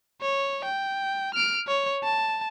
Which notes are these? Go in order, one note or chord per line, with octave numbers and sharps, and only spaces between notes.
C#5
G5
F6 D7
C#5
A5